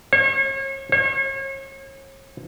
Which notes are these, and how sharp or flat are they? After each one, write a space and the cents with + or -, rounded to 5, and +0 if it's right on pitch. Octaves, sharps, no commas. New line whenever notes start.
C#5 -40
C#5 -40